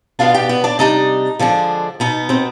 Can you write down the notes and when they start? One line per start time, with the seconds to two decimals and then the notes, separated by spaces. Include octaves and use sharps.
0.19 B2 B3 D4 F4 F5
0.34 G4 G5
0.49 B3 B4
0.64 D4 D5
0.79 C3 G3 D4 D#4 D#5
1.39 D3 F3 G#3 D4
2.00 B2 B3 D#4
2.29 C4 C5